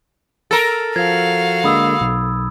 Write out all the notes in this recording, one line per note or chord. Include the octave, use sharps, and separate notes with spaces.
A4 A#4 A6
F3 F#4 F5 G#6
D3 G#3 A#3 B5 D#6 E6
B1